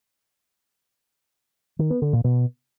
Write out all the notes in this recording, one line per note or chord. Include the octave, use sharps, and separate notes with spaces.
D#3
B3
D3
A#2
B2